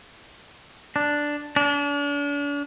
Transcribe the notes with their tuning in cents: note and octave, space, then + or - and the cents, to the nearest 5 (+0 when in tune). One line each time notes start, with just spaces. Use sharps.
D4 +0
D4 -40